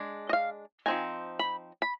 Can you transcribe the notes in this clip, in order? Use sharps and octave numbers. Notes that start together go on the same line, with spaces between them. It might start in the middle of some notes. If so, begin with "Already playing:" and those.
Already playing: G#3 D4
D#5
F5
F3 C4 D#4 G#5
B5
B5